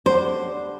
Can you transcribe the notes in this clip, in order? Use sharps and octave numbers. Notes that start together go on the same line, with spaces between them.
D3 G3 D4 C5